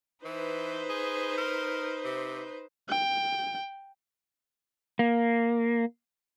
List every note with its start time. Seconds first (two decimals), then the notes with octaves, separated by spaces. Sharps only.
0.25 E3 D#4 B4 C5
0.89 G#4
1.38 A#4
2.04 C3
2.89 G5
4.99 A#3